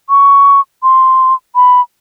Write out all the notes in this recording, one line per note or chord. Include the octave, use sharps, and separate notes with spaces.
C#6
C6
B5